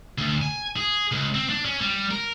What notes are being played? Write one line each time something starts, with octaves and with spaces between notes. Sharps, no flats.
D2
G#5
G#4
C#2
C4
D4
C#4
G3
A#4